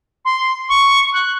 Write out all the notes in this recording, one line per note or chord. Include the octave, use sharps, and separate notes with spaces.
C6
C#6
F#6